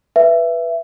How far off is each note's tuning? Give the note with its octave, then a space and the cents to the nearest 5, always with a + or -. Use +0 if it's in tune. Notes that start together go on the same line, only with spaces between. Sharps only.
B4 -5 E5 +20